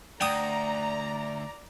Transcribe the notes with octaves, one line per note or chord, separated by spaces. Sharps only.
D2 D5 G5 A#5 D#6